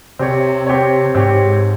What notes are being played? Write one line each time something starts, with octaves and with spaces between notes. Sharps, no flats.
C3 C4 G4 C#5
C4 G4 C#5
G#2 C4 G4 C#5